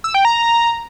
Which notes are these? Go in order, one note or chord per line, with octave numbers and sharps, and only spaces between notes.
E6
G5
A#5